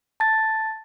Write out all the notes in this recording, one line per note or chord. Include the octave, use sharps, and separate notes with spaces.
A5 A6